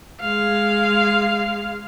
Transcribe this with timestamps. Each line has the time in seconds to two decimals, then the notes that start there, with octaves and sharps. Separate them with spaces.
0.21 G#3 F5